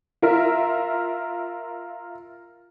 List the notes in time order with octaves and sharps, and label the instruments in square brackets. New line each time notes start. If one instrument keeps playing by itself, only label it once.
[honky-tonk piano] F4 A#4 E5